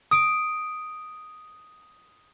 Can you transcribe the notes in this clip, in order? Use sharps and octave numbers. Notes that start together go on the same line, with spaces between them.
D#6 D7